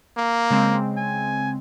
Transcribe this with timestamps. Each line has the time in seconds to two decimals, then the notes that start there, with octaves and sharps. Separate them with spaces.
0.17 A#3
0.51 C#3 G#3 C4
0.97 G#5